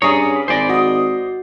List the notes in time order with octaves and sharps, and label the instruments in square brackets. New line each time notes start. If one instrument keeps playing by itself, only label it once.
[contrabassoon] G2 [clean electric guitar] C#4 G#4 C#5 [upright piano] D5 C#6 D#6 [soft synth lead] A#5
[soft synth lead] B5
[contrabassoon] G#1 [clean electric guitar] C5 D5 [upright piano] G#5 A#6
[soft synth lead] F#4 [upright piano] D#5 D#6